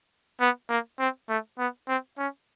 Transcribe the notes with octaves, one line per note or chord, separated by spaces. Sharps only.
B3
A#3
C4
A3
B3
C4
C#4